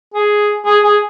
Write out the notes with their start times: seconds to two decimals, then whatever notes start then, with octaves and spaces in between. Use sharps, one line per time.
0.15 G#4
0.66 G#4
0.84 G#4